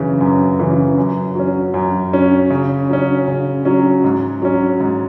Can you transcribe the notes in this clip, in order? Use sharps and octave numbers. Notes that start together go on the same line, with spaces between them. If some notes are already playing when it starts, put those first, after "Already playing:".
Already playing: F#2 C#3 E3
F#2
C#3 E3
F#2
F#3 C#4
F#2
F#3 C#4
C#3
F#3 C#4
C#3
F#3 C#4
G#2
F#3 C#4
G#2